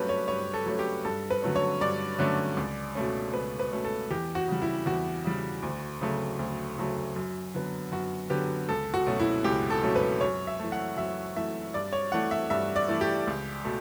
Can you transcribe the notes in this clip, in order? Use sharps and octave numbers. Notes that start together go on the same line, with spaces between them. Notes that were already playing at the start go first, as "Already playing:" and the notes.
Already playing: G2 F#3 A3 C#4 G4 B4
C#5
G2 C#5
A4
F#3 A3 C#4
G4
G2 A4
B4
D3 F#3 A3 C#4
C#5
G2 D5
D3 F#3 A3 C#4
C#2
B2 A3 C#4
C#2 B4
B4
B2 A3 C#4
A4
E2 G4
F#4
C#3 G3
E4
E2 F#4
C#3 G3
D2
C#3 F#3 A3
D2
C#3 F#3 A3
F#2
D3 F#3 B3
F#2 F#4
D3 F#3 B3 G4
C#2 A4
F#4
B2 F#3 A3 C#4
E4
C#2 G4
A4
B2 F#3 A3 C#4
B4
F#2 C#5
E5
E3 A3
F#5
F#2 E5
E3 A3 E5
G2 D5
C#5
E3 A3 F#5
E5
G2 E5
D5
E3 A3
G4
C#2
B2 A3